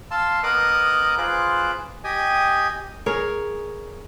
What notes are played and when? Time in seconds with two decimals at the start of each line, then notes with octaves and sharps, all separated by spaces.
0.11 F5 A5 C6 E6
0.43 B3 A#4 D#5 D6 D#6 F#6
1.18 F4 G#4 B4 C5 D6 F#6
2.04 G4 D#5 G5 G#5 D#6
3.06 G#4 A#4 C#5